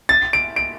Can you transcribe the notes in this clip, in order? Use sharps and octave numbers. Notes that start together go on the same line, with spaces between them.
A6
D7
D7